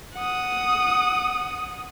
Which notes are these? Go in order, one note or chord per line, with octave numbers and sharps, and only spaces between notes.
F#5 D#6